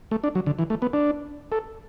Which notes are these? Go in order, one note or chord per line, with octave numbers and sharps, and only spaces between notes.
A3
D4
F#3
D3
E3
A3
B3
D4
A4